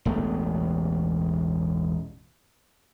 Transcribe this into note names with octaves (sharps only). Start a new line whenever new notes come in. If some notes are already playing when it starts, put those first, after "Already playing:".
E1 A1 A3 B3